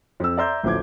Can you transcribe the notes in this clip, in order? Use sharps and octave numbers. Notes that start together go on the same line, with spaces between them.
F2 E6
D5 E5 A#5 C6 E6 G6
A1 D2 F3 D6 G#6